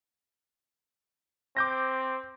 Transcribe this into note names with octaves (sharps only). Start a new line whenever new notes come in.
C4 D6 G6 A#6